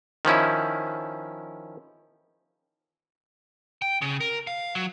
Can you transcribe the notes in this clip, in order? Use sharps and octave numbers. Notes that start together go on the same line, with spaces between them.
D#3 F3 C#4 E4
G5
C#3
A#4
F5
F#3